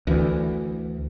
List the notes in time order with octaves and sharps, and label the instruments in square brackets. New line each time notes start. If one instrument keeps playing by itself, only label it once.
[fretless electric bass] D2 E3